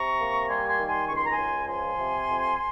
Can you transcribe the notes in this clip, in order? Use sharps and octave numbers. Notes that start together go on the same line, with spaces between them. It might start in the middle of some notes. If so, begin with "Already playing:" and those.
Already playing: C3 A#5 C#6
A#3
G3 G#5 C6
G#5 C6
D#3
G#5 C6
C#2 C#6
C6
A#5
G#5 C6
C#2
F3 G#5 C6
C3
F2